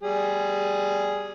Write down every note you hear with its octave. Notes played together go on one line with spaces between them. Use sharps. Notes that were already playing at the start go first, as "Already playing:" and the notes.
G3 G#4